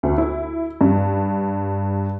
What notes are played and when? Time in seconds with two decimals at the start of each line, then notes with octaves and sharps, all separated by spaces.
0.03 D2
0.18 E4
0.81 G2